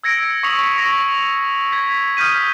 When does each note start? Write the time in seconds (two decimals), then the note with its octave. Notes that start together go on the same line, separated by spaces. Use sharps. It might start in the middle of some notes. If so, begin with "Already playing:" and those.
0.04 E6 G#6 A#6 C#7 D7
0.43 C#6 D#6 B6 C#7 F7 F#7
0.77 C#6 A#6 C#7 F7
1.72 G#6 B6
2.17 D#6 F6 G6 B6 D#7